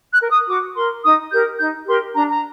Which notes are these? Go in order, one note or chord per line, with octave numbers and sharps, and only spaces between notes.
F#6
A#4
D#6
F#4 D6
A#4 C6
D#4 D#6
G4 A#4 G6
D#4 G6
G4 A#4 C6
D4 A#5
A#5